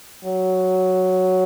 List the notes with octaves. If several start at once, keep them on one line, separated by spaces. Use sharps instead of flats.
F#3